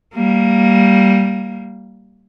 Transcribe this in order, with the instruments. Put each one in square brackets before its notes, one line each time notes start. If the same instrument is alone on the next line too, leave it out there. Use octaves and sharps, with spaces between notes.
[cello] G3 A#3